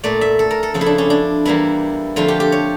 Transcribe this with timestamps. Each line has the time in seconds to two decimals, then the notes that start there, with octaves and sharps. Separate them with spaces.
0.04 A#2 A3 D5
0.21 E5
0.39 A4
0.51 A#4
0.63 A4
0.74 F2 C#3 F3 A4
0.81 E4
0.86 D4
0.98 C#4
1.10 D4
1.45 E2 E3 G3 A#3 E4
2.16 F2 D3 F3 A3 F4
2.28 G4
2.40 G4
2.52 C#5